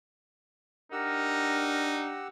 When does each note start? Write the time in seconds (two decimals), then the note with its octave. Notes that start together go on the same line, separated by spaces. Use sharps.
0.92 D4 D#4 G4 A#4 F#5 E6